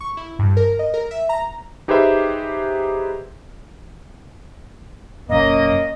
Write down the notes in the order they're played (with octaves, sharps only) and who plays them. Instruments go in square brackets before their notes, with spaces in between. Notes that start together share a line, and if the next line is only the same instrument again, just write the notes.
[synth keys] C#6
E4
G2
A#4
D#5
A#4
E5
A#5
[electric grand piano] D#4 G4 G#4 B4 C5 E5
[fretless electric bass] F#1 B1 F#2 [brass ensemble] A#3 C#4 [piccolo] D#5